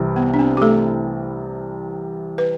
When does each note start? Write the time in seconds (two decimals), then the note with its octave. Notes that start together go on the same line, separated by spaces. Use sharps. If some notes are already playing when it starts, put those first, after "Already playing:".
Already playing: C2 C3 E3
0.16 B3
0.34 D4
0.39 C4
0.57 G4
0.62 A3 A4
2.38 B4